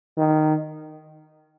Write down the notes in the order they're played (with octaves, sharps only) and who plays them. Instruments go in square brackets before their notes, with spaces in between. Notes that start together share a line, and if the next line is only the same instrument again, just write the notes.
[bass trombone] D#3